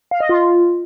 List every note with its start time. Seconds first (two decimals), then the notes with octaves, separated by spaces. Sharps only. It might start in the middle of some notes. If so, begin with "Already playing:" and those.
0.11 F5
0.20 D#5
0.29 F4